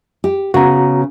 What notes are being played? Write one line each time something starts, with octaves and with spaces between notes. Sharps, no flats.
G4
C#3 B3 F#4 A#5